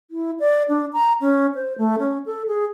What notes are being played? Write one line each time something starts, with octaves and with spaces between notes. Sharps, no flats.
E4
D5
D4
A#5
C#4
C5
A3
C#4
A4
G#4